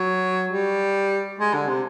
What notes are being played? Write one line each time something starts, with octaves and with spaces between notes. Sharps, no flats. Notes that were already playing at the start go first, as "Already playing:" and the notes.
Already playing: F#3
G3
G#3
D3
C3